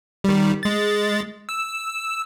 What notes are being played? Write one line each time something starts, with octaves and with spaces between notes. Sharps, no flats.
D#3 G3
G#3 A6
E6